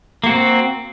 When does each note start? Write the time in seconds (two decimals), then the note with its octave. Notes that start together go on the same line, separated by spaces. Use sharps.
0.24 A#3
0.26 F#4
0.29 C4